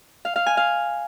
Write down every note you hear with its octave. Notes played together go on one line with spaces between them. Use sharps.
F5
F5
G#5
F5